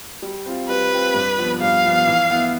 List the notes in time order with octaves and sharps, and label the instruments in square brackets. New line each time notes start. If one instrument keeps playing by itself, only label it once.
[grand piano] G3
C4 F4
[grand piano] G3 [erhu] B4
[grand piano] C4 F4
G2
F3 B3
[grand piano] G2 [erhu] F5
[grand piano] F3 B3
E3
B3 E4